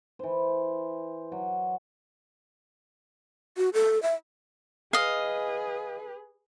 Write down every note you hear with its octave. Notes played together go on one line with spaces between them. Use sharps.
E3 C5
F#3
F#4
A4
E5
G#4 B4 D#5 F5